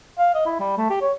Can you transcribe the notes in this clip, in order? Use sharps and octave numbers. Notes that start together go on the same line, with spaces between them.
F5
D#5
E4
G3
A3
G4
C#5